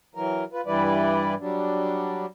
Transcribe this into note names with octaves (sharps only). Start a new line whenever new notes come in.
E3 F#3 A#4
F4 B4
G2 E3 G3 E4 B4 D5
F#3 G3 D4